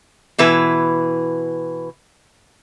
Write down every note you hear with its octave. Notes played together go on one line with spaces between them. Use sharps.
B2 E3 E4 B4